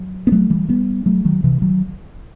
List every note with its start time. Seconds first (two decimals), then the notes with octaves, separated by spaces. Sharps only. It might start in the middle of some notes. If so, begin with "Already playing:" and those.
Already playing: F#3
0.27 B3
0.32 F#3 A3
0.50 E3 G3
0.69 G3 B3
1.06 F#3 A3
1.25 D#3 F#3
1.44 C3 E3
1.62 D#3 F#3